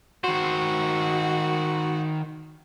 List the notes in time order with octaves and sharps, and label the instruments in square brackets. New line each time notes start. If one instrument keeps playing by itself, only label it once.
[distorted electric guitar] D#3 C5 [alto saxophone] F#4